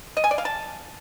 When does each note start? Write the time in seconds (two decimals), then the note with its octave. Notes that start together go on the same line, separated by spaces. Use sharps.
0.17 D#5
0.24 G#5
0.31 D5
0.38 F5
0.45 A5